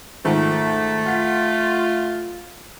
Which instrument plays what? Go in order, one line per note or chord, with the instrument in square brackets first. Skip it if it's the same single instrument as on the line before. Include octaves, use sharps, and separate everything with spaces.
[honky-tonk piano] G#2 D#3 F3 [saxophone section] A3
[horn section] F4 [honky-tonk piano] F#5 B6